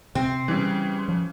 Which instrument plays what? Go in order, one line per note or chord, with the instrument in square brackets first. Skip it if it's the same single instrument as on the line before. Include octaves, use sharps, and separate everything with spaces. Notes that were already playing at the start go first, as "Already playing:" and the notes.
[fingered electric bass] C3 [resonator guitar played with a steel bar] C4
[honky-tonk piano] C#3 E3 [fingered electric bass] G3
[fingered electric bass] F3